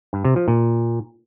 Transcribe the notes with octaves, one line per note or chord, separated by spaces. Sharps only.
G2
C3
F3
A#2